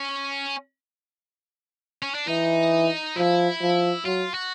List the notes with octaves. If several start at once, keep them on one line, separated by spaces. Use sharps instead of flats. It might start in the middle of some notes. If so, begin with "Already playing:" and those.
Already playing: C#4
C#4
D4
E3 D#4
F3 E4
F3
F#3 F4
F#4